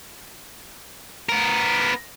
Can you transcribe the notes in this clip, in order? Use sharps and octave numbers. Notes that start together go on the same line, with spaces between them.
B3 A#4